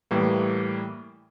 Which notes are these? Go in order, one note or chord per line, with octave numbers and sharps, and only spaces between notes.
A2 E3 G3 A#3